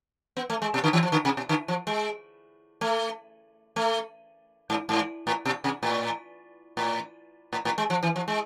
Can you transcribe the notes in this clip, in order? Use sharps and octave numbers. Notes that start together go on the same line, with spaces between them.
B3
A3
G#3
B2
D3
E3
F3
D3
C3
B2
D3
F3
G#3
A3
A3
G#2
G#2
A2
B2
C3
A2
A2
A2
A2
G#3
F3
E3
F3
G#3